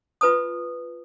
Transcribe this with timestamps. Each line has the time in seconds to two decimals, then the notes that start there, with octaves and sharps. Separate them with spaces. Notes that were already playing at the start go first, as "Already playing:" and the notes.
0.21 F4 B4 A5 D#6